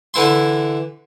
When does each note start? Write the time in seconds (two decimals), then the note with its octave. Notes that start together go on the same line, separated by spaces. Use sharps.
0.14 D3 E3 E4 C6